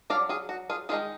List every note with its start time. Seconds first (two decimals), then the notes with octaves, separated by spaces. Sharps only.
0.10 F#3 D4 D5 F5
0.29 F4 G#4
0.49 F#4
0.70 F4 G#4
0.89 D#3 G#3 D#4 F4 G#4